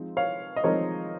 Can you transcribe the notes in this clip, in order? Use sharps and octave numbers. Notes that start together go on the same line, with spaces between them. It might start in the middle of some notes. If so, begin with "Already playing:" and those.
Already playing: F3 G#3 C4 D#4
C#5 F5
D#5
F3 G#3 C4 D#4 A#4 C#5